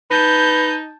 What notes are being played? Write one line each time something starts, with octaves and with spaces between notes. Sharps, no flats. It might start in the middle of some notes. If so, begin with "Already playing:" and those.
D#4 B4 A5 G6